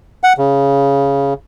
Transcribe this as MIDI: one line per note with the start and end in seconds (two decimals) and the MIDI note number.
0.24 0.33 78
0.38 1.34 49